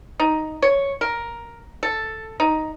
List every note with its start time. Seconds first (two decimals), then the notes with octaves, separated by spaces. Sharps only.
0.20 D#4
0.62 C#5
1.01 A#4
1.83 A4
2.40 D#4